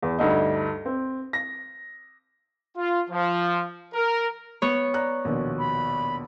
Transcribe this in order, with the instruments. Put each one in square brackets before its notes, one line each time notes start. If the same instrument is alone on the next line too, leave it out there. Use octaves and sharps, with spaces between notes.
[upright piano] E2
D2 G2 D#4
C4
A#6
[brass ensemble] F4
F3
A#4
[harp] B3 C#5
[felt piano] D5 A#5 F#6
A#1 D#2 B2
[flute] B5